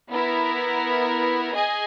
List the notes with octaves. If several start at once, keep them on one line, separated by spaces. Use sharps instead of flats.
B3 E4 A#4
G#4 D#5 G#5